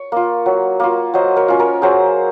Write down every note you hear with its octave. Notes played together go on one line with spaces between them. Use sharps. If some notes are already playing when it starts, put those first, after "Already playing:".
Already playing: C#5
A#3 F4
F#3
A#3 F4
F#3 C5 D#5
A#4 C#5
C#4 F4
A#4 C#5
F#3 G#4 C5